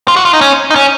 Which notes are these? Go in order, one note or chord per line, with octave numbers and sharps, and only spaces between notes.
F4
F#4
F4
D#4
C#4
D#4
C#4